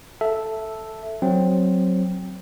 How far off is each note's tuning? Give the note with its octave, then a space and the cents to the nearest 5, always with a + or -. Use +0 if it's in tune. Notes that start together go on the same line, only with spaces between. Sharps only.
A4 +0 E5 +0
F#3 +0 C4 +0